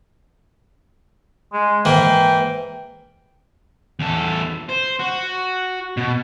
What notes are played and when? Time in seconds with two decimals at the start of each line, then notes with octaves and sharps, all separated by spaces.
1.53 G#3
1.85 G#2 E3 A#3 G5
4.00 E2 A4
4.70 C5
4.99 F#4
5.97 B2